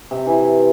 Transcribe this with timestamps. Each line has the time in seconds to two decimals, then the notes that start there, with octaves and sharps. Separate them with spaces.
0.11 C3
0.27 E3